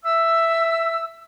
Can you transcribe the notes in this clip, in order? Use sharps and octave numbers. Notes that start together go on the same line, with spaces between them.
E5 E6